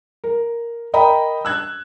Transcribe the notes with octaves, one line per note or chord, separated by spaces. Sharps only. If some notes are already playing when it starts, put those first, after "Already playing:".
A#4
A#4 D#5 G5 A#5 B5
E6 F#6 G#6